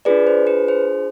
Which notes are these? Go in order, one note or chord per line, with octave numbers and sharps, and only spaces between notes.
D4 F4 G#4 B4 D5
C5
B4
C5